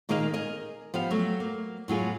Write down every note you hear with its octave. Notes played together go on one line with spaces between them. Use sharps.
A#2 D#3 A#3 G#4 D#5 F5
G#4 A#4 D#5
F3 B3 G4 F5
F#3 A3
A#3
A2 F#3 F4 G#4